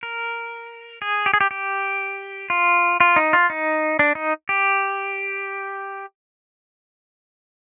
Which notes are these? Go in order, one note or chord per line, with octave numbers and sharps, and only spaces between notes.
A#4
G#4
G4
G#4
G4
G4
F4
F4
D#4
F4
D#4
D4
D#4
G4